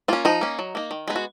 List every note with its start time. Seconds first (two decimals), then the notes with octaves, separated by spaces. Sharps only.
0.08 A#3 C#4 F4
0.25 F3 D#4
0.41 A#3 C#4
0.59 F#3
0.75 A#3 D#4
0.91 D#3
1.08 G#3 B3 D#4
1.16 F#4